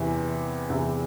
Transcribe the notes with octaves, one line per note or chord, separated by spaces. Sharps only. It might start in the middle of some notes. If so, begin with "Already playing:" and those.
Already playing: E2 C3 E3
E2 C3 E3